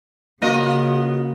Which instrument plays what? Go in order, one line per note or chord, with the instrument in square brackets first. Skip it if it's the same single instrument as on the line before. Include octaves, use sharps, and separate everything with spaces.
[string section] C#3 [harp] A#3 D#7 [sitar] B3 F4 D#5 [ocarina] F#4